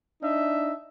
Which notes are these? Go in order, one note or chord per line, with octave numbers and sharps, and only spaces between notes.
D4 D#4 E5